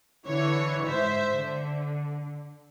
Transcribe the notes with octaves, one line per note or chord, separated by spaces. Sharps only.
D3 E3 C#5
G#2 C5 E5
D3